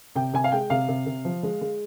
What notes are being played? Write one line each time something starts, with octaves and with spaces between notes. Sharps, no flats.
C3 G5
C3 G#5
F5
G#3 G5
C3 F5
C3
C3
F3
G#3
G#3